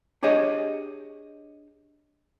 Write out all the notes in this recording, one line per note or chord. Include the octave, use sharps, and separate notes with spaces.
D4 G4 G#4 C#5 D#5